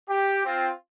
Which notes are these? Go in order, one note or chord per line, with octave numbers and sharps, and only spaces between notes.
G4
C4 F4